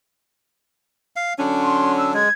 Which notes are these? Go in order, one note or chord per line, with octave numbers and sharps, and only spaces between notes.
F5
D3 F#3 C#4 D4
C6
E6
G#3 G#6